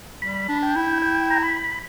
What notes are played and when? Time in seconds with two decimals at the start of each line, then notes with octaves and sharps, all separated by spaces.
0.22 G3 B5
0.49 D4
0.62 G5
0.76 E4
1.02 G5
1.30 A#5
1.42 B5